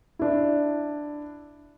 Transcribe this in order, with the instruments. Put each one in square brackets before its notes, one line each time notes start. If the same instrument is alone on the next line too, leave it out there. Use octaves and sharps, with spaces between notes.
[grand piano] D4 E4